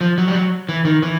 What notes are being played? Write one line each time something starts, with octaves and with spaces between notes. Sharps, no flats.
F3
F#3
G3
F#3
E3
D#3
E3